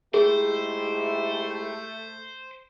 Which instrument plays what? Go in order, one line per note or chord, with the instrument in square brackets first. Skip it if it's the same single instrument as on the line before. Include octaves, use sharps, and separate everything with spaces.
[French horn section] G#2 E4 G4 [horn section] A3 [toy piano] G#4 [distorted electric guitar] C5